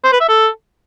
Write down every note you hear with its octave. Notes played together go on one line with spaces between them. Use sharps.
C5
B4
E5
A4